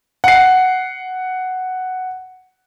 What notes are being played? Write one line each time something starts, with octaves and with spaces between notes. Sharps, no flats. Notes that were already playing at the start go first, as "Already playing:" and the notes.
F#5 C7